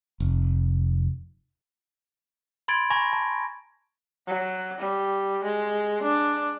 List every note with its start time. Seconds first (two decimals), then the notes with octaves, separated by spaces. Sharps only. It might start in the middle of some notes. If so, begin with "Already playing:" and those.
0.20 F1
2.68 B5 C6 G#6 A6 D7
2.90 G#5 A#5 B5 C#6 G#6 A#6
3.13 A5
4.27 F#3
4.78 G3
5.44 G#3
6.03 D4